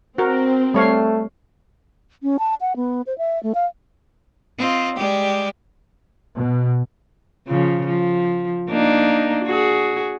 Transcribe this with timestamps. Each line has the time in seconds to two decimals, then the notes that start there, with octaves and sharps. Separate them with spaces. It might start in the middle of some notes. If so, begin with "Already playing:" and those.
0.18 C4 F#4 A#4
0.74 G3 A3 C#5 F5
2.23 C#4
2.39 A5
2.61 F#5
2.76 B3
3.07 C5
3.18 E5
3.43 A3
3.55 F5
4.58 C4 F4 D#5
4.96 G3 G#3 G4
6.36 B2
7.48 C#3 F3
7.87 F3
8.70 A#3 D4 D#4
9.44 F#4 G#4